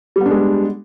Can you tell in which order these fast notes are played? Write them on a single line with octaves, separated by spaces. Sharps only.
G3 B3 D4 G#3